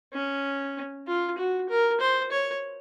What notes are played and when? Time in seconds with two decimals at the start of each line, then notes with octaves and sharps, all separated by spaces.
0.14 C#4
1.07 F4
1.38 F#4
1.70 A#4
2.00 C5
2.32 C#5